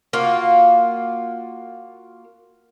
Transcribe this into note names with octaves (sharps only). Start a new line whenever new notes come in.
A#3 F4 F#4